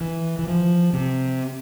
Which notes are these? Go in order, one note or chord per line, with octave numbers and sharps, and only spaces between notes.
E3
E3
F3
C3